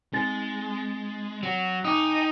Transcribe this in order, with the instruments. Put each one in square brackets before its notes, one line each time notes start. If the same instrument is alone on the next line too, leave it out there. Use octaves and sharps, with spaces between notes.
[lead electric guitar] G#3 [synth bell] C4 A6
[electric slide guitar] F#3
[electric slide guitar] D#4 [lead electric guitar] G5 G#5 [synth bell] D6 D#6